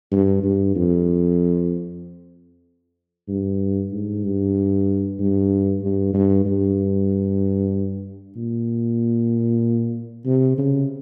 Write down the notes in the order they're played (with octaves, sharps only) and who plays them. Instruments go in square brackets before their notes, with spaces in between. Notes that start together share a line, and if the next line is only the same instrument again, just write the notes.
[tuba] G2
G2
F2
G2
G#2
G2
G2
G2
G2
G2
A#2
C3
C#3